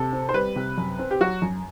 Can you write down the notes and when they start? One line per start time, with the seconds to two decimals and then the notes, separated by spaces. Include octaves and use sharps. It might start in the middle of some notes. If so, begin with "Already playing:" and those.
Already playing: C3 A4
0.13 C4
0.29 C5
0.34 G3 B4
0.56 C3
0.78 F#2
0.99 C4
1.11 G4
1.21 F#3 F#4
1.42 F#2